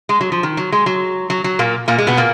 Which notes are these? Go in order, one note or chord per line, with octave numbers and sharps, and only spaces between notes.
G#3
F#3
F3
D#3
F#3
G#3
F#3
F#3
F#3
A#2 A#3
A#2 A#3
G#3
B2 B3
A#2 A#3